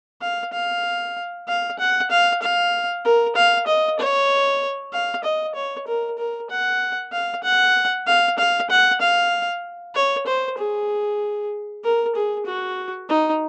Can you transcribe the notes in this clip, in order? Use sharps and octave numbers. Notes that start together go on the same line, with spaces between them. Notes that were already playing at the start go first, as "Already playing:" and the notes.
F5
F5
F5
F#5
F5
F5
A#4
F5
D#5
C#5
F5
D#5
C#5
A#4
A#4
F#5
F5
F#5
F5
F5
F#5
F5
C#5
C5
G#4
A#4
G#4
F#4
D#4